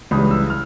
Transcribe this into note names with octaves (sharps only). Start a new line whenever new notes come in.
C#2 C#3 E3 G3 D#6
E6
F6